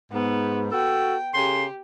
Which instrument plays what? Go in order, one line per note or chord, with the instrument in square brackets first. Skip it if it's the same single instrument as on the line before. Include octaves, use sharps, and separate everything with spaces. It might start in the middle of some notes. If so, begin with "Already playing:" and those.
[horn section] G#2 [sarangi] B3
[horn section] F#4 A4 [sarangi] G5
[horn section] C#3 A4 C6 [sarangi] G4